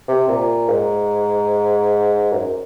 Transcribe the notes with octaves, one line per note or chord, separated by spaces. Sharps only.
C3
A#2
G#2
F#2